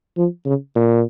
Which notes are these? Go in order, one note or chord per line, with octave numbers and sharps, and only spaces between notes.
F3
C#3
A#2